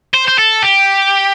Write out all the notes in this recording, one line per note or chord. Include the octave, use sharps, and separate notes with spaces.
C5
C5
A4
G4